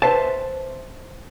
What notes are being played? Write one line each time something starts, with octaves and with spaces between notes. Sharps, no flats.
B4 C5 E5 A5